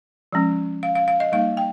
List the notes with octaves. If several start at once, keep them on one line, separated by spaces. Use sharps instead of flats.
F3 G#3 C#4
F5
F5
F5
D#5
G3 A#3 D#4 F5
G5